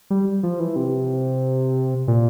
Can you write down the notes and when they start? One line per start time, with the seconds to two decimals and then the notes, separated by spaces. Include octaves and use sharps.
0.10 G3
0.43 F3
0.60 E3
0.76 C3
2.08 A#2